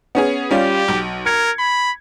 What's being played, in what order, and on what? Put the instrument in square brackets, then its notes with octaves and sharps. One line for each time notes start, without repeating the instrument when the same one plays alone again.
[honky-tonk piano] B3 C#4 G#4
[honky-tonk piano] G3 C#4 F4 [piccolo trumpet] G4
[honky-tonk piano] B1
[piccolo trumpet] A#4 [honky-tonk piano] G#6 C#7
[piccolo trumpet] B5